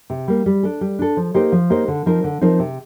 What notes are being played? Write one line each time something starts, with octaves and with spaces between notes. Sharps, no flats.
C3
G3 A#3
G3
D4 A4
G3
D4 A4
F3
A#3 D#4 G4 C5
F3
A#3 D#4 G4 C5
D3
F3 C4 D#4 A#4
D3
F3 C4 D#4 A#4
C3